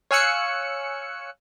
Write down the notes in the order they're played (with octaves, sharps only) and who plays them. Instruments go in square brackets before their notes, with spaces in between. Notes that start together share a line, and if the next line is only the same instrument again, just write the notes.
[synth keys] C#5 F5 G#5 E6 F#6 C#7